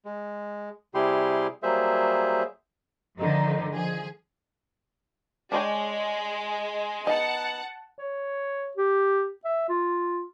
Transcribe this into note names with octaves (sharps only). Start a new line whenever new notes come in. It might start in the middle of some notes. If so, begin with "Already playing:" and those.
G#3
C3 G3 E4 G4 G#4 C6
F#3 G3 A#3 G#4 C5 E5
D3 D#3 F3 D#4
F3 G#4
G#3 D4 C#5 G5
B3 D#4 F#5 A5
C#5
G4
E5
F4